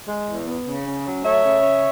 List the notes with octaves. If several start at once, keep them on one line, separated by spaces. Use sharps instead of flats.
G#3
E2
B3
C#3
C#4
F#3
A3 C#5 E5
C#3
C#4